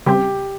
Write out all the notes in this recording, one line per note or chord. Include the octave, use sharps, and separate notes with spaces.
C#3 G3 C4 G4